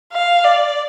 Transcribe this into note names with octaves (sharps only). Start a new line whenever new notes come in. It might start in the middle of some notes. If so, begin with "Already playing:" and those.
F5
D5